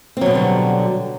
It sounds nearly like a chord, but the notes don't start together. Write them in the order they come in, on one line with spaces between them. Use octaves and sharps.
C4 F#3 B2 D3 G3